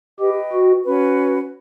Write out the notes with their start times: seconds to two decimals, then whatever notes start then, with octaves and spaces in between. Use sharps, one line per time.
0.20 G4 B4 D#5 G5
0.53 F#4
0.85 C#4 F#4 B4